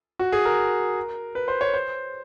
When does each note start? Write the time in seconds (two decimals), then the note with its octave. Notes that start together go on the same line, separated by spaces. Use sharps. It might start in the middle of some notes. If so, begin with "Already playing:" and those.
0.19 F#4
0.32 G#4
0.45 A#4
1.35 B4
1.48 C5
1.61 C#5
1.74 C5